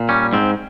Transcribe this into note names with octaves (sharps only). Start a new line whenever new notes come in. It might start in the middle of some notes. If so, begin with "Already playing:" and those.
Already playing: A#2
G3 C#4
G#2 C4